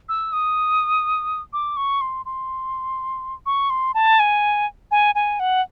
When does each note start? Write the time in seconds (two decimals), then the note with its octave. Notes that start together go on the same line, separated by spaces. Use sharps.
0.09 E6
0.33 D#6
1.53 D6
1.77 C#6
2.01 C6
2.26 C6
3.46 C#6
3.70 C6
3.94 A5
4.19 G#5
4.91 G#5
5.15 G#5
5.40 F#5